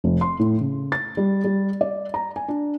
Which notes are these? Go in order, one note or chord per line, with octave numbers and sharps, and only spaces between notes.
F1
C6
A2
C#3
A6
G3
G3
D5
A#5
G#5
D4